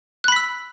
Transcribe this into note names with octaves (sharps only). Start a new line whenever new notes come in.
B5 E6 F#6 B6